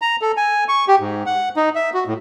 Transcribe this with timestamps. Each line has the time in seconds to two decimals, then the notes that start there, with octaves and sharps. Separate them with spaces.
0.02 A#5
0.22 A4
0.37 G#5
0.68 C#6
0.88 G4
1.00 G#2
1.26 F#5
1.56 D#4
1.75 E5
1.94 F#4
2.07 A2